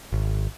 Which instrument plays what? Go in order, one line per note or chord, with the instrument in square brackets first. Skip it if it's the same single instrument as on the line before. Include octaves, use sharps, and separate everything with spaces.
[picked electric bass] G#1